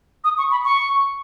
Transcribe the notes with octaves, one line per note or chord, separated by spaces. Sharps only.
D#6
C#6
B5
C#6